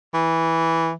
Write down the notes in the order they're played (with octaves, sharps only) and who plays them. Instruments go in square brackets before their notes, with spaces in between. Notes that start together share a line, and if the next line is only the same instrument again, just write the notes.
[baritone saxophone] E3